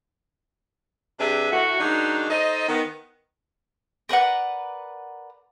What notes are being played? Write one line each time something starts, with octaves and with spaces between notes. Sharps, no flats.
C3 G3 D4 G#4 B4 E5
A2 A3 F#4
D#3 F#3 G#3 D4 D#4
D#4 A4 C5 D#5
D#3 B3
A#4 B4 D5 F#5